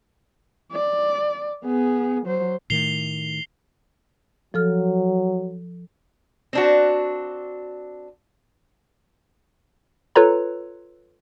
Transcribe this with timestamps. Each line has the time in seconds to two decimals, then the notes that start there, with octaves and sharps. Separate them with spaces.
0.72 D5
1.64 B3 G#4
2.26 F#3 C5
2.70 A2 D#3 A3 C7 F7 G7
4.54 F3 F#3 A4 F6
6.53 C4 D4 F#4
10.15 F4 A4 B4 C#5 A#5